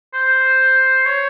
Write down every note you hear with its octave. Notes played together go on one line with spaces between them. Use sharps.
C5
C#5